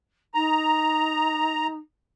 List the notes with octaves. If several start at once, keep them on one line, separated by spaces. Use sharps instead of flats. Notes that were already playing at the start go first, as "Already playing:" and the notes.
D#4 A#5